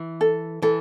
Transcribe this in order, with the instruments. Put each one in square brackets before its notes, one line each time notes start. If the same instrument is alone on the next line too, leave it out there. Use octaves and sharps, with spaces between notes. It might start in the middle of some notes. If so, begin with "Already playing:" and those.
Already playing: [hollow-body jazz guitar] E3
[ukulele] A4
[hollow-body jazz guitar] E3 [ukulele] A4